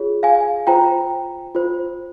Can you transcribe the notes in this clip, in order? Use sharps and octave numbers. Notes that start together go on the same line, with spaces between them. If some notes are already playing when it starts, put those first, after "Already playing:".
Already playing: F4 G#4 C#5
F5 G#5
F4 C5 G5 A#5
F4 C5